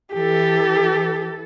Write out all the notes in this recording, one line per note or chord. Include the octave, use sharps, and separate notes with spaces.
E3 G4 A4